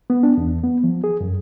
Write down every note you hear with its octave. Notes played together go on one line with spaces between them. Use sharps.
B3
D4
E2
B3
F3
G#4
F#2